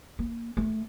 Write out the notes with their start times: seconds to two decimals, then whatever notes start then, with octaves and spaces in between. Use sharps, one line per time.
0.19 A#3
0.57 A3